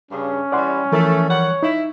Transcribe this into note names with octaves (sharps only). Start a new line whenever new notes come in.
G2 C#3 C#4
E3 G3 D5 F#5 C6
E3 F3 A3 A#4
G3 C#5 F#5
D#4 E4